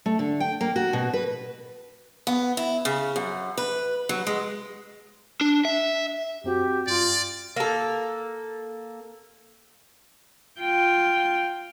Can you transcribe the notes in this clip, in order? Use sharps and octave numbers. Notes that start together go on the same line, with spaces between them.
A3
D3
G5
A#3
F#4
B2
B4
B3
E4
C#3
F#2
B4
F#3
G#3
D4
E5
F#2 C4 F#4 G4
G2 F4 D5
A#3 A4
F4 G5